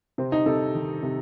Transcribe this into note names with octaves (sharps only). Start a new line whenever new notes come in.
C3 C4
D#4
C3 A4
D#3
C3